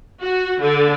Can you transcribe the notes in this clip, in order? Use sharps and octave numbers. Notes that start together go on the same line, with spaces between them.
F#4
D3